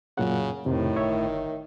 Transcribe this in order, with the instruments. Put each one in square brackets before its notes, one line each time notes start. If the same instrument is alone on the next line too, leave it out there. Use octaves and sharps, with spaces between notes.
[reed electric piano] F#2 A#2 F#5 [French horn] C#3
[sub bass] F2 [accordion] A2 [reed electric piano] C3 [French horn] D#3
[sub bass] G1 [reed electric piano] C#5 E5